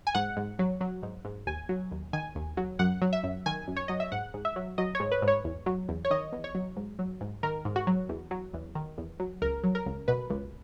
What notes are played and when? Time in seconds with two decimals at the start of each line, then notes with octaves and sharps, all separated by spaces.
0.07 G#5
0.15 G#2 F#5
0.37 G#2
0.59 F#3
0.81 F#3
1.03 G#2
1.25 G#2
1.47 D#2 G#5
1.69 F#3
1.91 D#2
2.13 D#3 G#5
2.35 D#2
2.57 F#3
2.79 F#2 F#5
3.02 F#3
3.13 E5
3.23 F#2
3.46 D#3 G#5
3.68 F#2
3.76 C#5
3.88 F#3 D#5
4.00 E5
4.12 G#2 F#5
4.34 G#2
4.45 E5
4.56 F#3
4.78 F#3 D#5
4.95 C#5
5.00 G#2
5.12 B4
5.22 G#2
5.28 C#5
5.44 E2
5.66 F#3
5.89 E2
6.05 C#5
6.11 D#3 D#5
6.32 E2
6.44 C#5
6.55 F#3
6.77 G#2
6.99 F#3
7.21 G#2
7.43 D#3 A#4
7.65 G#2
7.76 F#4
7.87 F#3
8.09 E2
8.31 F#3
8.54 E2
8.75 D#3
8.98 E2
9.20 F#3
9.42 C#2 A#4
9.64 F#3
9.75 A#4
9.86 C#2
10.08 B2 B4
10.30 C#2